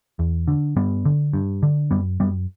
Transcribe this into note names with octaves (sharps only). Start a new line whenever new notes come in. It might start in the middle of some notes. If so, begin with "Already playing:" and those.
E2
D3
G2 G3 B3
D3
G2
D3
F#2 G3 B3
F#2 G3 B3